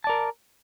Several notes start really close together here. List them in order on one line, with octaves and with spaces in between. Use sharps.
A5 D5 A#4